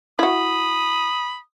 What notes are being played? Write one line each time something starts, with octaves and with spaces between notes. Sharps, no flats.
E4 F#4 B5 D#6